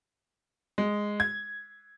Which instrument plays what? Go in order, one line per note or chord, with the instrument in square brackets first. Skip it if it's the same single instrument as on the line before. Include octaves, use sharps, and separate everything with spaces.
[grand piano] G#3
G#6